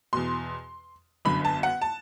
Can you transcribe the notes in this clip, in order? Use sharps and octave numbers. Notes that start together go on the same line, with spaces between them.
E2 B2 C6
G1 F#2 D3 B5
A5
F#5
A5